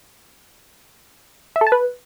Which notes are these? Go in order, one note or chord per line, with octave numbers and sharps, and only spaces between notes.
E5
A4
A5
B4